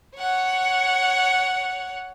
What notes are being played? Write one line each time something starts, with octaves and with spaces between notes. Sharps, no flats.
C#5 F#5